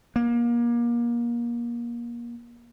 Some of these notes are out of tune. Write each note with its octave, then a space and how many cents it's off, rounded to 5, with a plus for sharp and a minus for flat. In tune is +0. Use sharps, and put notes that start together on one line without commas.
A#3 +25